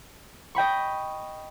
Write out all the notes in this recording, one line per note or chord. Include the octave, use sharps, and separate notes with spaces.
D#5 G5 B5 C#6